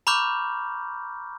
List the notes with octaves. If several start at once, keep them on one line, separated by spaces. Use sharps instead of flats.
A#5 B5 C#6 D6 F6 G6